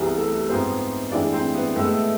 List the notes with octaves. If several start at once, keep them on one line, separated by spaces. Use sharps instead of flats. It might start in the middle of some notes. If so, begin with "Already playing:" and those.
Already playing: C2 C3 E3 B3 G#4
A3 A4
G#2 F3 G#3 B3 C4 C5
A2 E3 G#3 D4 D5
C4 C5
B3 B4
A2 G#3 A3 B3 A4